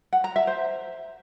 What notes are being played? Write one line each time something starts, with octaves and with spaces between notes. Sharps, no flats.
F#5
A#5
E5
C5